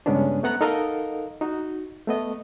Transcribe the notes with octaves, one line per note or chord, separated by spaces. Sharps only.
G2 C#3 G#3 B3 C#4 D4
A3 B3 F#5 A#5 F#6
D#4 A4 A#4 D#5 F5 F#5
D#4 F#4
A3 B3 D#5